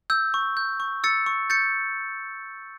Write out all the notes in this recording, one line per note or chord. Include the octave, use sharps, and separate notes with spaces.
E6 G6
C#6
G6
C#6
E6 A6 C#7
C#6
G6 A6 C#7